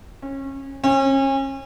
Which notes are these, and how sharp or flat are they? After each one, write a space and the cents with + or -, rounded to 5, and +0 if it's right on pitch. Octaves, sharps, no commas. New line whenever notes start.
C#4 -25
C#4 -35